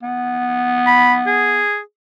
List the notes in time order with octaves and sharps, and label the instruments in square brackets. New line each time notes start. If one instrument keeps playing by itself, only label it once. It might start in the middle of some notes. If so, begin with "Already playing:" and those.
[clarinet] B3
[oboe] B5
G#4